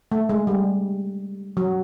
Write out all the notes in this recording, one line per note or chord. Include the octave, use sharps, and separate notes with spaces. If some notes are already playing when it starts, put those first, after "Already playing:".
A3
G#3
G3
F#3